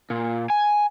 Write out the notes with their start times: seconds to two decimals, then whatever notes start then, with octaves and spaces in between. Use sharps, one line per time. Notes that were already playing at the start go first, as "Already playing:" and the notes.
0.10 A#2
0.50 G#5